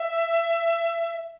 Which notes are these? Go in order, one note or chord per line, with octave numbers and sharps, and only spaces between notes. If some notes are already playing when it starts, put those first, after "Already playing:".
Already playing: E5